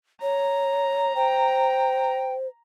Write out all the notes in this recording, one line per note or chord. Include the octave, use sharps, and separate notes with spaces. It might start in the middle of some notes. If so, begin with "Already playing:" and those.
C#5 A#5
C5 G5